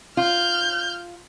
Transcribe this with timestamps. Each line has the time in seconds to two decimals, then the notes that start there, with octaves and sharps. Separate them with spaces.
0.17 F4 F6 G6